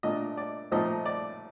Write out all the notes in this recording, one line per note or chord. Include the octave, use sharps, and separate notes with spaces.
A#2 A3 D4 D#5
D5
A#2 F3 A3 C4 D#4 D#5
D5